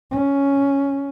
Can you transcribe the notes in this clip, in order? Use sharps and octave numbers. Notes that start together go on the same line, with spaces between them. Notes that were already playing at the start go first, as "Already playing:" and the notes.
C#4